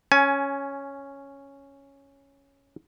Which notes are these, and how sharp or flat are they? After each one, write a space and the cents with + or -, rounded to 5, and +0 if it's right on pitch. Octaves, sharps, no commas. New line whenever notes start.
C#4 +0 G#5 +20